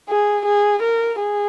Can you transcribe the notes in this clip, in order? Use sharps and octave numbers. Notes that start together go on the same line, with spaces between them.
G#4
G#4
A#4
G#4